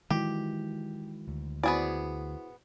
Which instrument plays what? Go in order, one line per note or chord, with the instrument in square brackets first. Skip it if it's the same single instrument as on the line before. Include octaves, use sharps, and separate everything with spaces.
[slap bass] D#3 G#3 [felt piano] E3 F#3 [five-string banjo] G4
[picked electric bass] D2
[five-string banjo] B3 G#4 D5 [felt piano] E4 F#4 C5